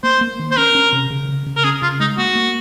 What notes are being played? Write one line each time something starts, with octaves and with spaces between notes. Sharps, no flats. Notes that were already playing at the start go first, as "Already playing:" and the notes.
A#3 C5
A#3
D#3
C5
C#4 A#4
C#4
C3
C#3
C#3
C#3
A#4
C#4 G#4
C#3 F4
G#3 D#4
A#3 F#4
A#3